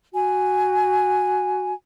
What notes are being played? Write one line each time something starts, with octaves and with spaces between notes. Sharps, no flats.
F#4 G#5